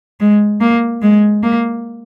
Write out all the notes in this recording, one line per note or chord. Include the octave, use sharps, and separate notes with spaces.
G#3
A#3
G#3
A#3